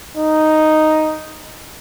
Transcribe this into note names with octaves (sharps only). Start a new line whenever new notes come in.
D#4